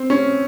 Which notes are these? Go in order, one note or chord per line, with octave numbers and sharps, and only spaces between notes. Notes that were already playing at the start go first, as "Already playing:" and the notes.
Already playing: C4
C#4